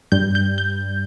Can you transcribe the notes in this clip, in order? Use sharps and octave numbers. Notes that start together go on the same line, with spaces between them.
G2 G3 G6
G6
G6